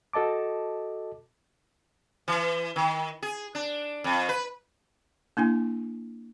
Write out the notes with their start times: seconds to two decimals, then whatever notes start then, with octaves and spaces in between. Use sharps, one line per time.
0.13 F#4 A4 D#5 A5 D6
2.28 E3
2.76 D#3
3.23 G#4
3.55 D4
4.04 F2
4.29 B4
5.37 A#3 D4 E4 G#5